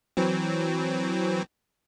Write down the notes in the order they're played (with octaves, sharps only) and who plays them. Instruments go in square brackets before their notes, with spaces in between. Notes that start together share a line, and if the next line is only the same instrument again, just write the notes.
[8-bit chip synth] E3 F#3 C4